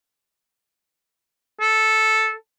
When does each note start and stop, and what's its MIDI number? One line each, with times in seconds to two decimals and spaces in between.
1.61 2.33 69